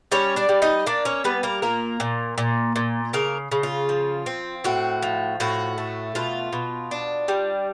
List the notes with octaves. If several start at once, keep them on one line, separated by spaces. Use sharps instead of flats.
G3 C#4 C#5
D4 D5
G3
D#4 D#5
A#3 D4 D5
C#4 C#5
G3 B3 B4
A#3 A#4
A#2 A#3 A#4
A#2
A#2
A#2
C#3 A#3 A#4
C#3
F4
F3
C4
A2 F#4
F3
A2 F#4
A3
B2 F4
B2
D4
G3